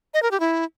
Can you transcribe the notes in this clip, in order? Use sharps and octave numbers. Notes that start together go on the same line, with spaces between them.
D#5
A#4
G4
E4